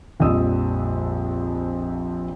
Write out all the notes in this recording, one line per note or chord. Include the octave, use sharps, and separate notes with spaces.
A#1 F2 G3 D#5 D#6 E6